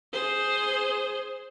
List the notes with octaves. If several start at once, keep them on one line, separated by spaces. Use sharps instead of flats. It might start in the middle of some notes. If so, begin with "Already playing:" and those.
G#4 C5